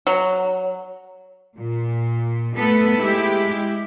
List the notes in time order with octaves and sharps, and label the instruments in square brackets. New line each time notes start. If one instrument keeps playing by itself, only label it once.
[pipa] F#3
[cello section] A#2
A3 B3 A4 B4
G#3 E4 G4